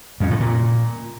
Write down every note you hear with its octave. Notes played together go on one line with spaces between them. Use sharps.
F2
A2
A#2